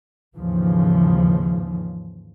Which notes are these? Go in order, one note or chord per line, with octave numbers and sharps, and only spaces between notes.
D#2 G#2 C#3 E3 F3